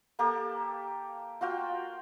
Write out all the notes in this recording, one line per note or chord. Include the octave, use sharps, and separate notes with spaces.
A#3 G4 A4
F4 F#4 F5 G5